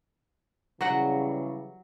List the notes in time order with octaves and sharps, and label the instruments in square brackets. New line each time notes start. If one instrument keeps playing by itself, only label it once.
[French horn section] C#3 E3 G3 [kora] F#3 F#4 F#5